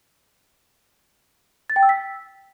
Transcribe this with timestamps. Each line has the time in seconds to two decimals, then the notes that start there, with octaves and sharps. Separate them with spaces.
1.70 A6
1.76 G5
1.83 E6
1.89 B6